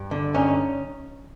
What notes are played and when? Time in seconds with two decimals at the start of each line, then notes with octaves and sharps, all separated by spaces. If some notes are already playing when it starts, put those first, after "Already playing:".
Already playing: G2
0.11 D3
0.34 G2 C#4 D#4